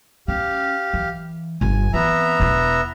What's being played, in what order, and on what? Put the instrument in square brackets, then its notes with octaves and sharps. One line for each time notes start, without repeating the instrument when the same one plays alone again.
[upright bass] C#4 [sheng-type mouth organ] G4 F5
[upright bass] E3
[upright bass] G1 G2 [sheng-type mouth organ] G#5
[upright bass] E3 C4 [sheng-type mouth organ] B3 E5 A#5
[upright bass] E1 E4